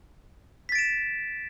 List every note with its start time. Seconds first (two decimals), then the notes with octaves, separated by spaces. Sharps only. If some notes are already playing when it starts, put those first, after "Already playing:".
0.69 B6
0.72 A6
0.75 D7
0.79 E7